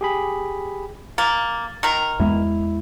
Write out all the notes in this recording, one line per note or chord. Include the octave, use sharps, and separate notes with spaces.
G4 G#4 B5
A#3 A6
D#3 A#4
E2 G#3 B3 E4